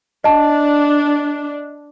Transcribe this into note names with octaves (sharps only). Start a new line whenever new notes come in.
D4 D#5 A5